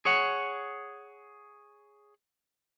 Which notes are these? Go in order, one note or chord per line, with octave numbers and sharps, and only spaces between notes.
G#4 C#5 F#5